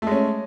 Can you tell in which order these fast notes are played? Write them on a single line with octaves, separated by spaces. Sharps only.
A3 G#3 C#4